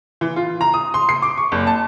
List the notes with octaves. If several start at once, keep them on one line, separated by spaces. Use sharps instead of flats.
E3
F4
A#5
D#6
C6
C7
D6
C#6
F#1
A5